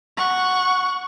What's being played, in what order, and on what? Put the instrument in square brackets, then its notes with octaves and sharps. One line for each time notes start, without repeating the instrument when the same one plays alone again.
[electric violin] F#5 C#6